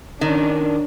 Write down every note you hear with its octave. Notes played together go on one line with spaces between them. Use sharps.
D#3 C#4 D4